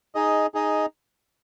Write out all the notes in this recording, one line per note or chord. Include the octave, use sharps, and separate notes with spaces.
D#4 G#4 D#5
D#4 G#4 D#5